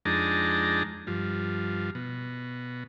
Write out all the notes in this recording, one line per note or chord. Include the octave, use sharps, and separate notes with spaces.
F2 G#3 D4 D#4 A5 A#5
G2 F3
B2